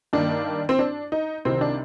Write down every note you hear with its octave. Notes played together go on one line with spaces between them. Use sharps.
G2 D#3 A#3 D4
C4
D4
D#4
C2 C3 D#3 C4
D4